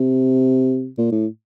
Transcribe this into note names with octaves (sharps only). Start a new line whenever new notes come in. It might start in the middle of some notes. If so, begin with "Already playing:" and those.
Already playing: C3
A#2
A2